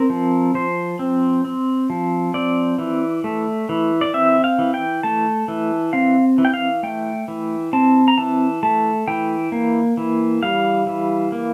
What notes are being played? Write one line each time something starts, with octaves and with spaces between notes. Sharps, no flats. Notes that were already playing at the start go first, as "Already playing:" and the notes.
Already playing: C4 A#4
F3
F3 C5
C4
C4
F3
C4 D5
E3
A3
E3
D5
C4 E5
F5
E3
G5
A3 A5
E3
C4 F5
E3
G5
F5
A3 G5
E3
C4 A5
A#5
E3 A5
A3 A5
E3 G5
A#3
E3
G3 F5
E3
A#3